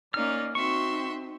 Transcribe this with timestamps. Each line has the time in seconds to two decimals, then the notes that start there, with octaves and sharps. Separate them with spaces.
0.14 A#3 C#4 D#4 D5 F6
0.55 C4 D#4 F#4 E5 C6 C#6